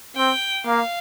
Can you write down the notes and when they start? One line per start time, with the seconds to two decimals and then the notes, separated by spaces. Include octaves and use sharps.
0.16 C4 G5
0.66 A#3 F5